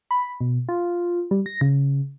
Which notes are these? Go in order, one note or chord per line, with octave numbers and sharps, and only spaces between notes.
B5
B2
F4
G3
A#6
C#3